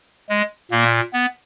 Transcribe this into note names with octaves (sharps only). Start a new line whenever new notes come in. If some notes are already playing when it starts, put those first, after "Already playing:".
G#3
A#2 A#3
B3